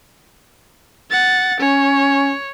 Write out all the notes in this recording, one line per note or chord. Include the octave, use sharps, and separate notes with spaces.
F#5 A6
C#4 C#5